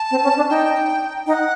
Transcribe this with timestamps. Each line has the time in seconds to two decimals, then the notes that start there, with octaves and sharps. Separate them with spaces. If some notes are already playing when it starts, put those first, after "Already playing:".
Already playing: A5
0.11 C4
0.23 C#4
0.37 D4
0.50 D#4 G5
1.27 D#4 G5
1.31 F#5